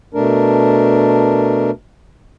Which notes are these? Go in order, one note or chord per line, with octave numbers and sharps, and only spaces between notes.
B2 A3 D4 A#4